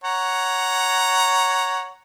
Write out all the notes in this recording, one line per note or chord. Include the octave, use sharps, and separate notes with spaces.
C#5 F#5 A#5